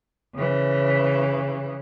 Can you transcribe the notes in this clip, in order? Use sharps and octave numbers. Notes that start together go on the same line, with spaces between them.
C#3 E3